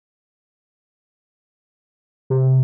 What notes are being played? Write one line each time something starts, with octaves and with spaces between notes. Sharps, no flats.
C3